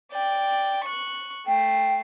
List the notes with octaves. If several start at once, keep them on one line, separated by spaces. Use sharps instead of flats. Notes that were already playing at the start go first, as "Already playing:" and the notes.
D5 G5
C#6 F#6
A3 G5 C7